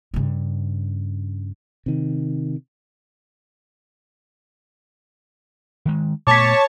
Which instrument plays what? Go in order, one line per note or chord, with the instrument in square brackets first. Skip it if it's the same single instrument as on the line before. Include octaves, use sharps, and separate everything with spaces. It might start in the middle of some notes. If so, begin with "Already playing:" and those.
[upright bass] G2 C#3
[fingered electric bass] C3 D#3
[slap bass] D#3 G#3
[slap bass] A#2 A3 B3 [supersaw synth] C#5 A5 C#6 [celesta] D6 B6